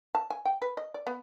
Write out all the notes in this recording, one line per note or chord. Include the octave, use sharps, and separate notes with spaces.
A5
G#5
G5
B4
D#5
D5
B3